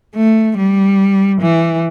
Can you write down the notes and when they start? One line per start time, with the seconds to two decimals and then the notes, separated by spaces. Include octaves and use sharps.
0.16 A3
0.57 G3
1.41 E3